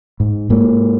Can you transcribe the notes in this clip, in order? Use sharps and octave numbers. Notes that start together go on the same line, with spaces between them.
G#2
G#2 A#3